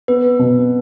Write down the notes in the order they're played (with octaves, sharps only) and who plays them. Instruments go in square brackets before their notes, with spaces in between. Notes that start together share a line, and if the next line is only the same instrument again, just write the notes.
[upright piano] B3 [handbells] B4
[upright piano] B2